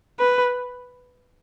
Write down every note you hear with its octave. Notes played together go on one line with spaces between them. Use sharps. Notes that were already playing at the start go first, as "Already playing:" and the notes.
B4